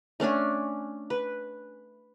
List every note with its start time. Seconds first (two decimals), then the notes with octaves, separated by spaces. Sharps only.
0.20 A3 C#4 D4 G#5
1.10 B4